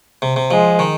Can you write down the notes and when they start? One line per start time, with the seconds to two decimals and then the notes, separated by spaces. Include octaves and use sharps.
0.22 C3
0.36 C3
0.51 F3 G#3
0.79 D#3